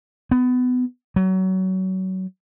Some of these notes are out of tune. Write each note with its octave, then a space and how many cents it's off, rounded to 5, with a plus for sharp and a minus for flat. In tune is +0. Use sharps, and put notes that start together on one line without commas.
B3 +20
F#3 +25